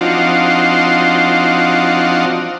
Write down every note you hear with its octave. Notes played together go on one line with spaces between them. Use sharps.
F3 C4 D4 D#4 F4 F#4